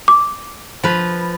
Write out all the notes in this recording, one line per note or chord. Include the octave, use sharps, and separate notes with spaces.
D6
F3 B4